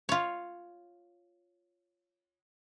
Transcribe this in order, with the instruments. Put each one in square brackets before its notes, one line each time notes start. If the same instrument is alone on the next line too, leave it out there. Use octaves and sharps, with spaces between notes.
[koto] F4 C#5